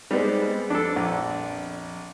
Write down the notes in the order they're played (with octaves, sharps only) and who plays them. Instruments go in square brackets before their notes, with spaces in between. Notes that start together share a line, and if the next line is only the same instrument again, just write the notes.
[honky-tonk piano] G3 B3 C4 [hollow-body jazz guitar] G#3 D#4
[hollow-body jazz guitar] F2 [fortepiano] D4 A4
[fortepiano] A#1